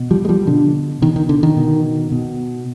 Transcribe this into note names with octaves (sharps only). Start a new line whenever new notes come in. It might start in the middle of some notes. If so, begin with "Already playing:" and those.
Already playing: B2
F3 G3
G#3
F3 G3
B2 D3
B2 D#3
D#3
D3
D#3
B2
B2